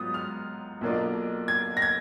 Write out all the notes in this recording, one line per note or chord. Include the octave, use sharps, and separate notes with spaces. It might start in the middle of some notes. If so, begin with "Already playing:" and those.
Already playing: G#2 F#3 B3 F4 D#6
F6
B1 B2 A#3 D4 F4
G#6
A#6
G#6